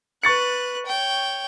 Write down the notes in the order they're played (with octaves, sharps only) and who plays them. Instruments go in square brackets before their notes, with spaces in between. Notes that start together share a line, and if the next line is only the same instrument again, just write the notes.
[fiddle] B4 F#6 [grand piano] C#6 A6 C#7
[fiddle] C#5 G5